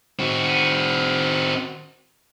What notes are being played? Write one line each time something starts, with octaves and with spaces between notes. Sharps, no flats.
C4 F#4